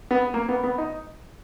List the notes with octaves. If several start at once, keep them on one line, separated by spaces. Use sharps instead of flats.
B3
A#3
B3
B3
D#4